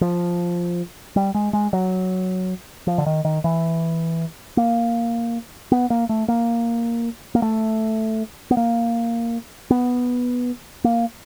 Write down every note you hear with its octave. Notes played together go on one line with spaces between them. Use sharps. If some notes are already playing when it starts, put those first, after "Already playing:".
F3
G3
G#3
G#3
F#3
F3
D3
D#3
D#3
E3
A#3
B3
A#3
A3
A#3
A#3
A3
B3
A#3
B3
A#3